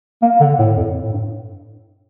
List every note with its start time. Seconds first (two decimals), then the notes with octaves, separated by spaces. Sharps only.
0.22 A#3
0.40 D3
0.59 A2
0.77 F2
1.03 A2
1.12 G2